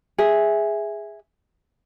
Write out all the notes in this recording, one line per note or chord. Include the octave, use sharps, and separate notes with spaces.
G#4 E5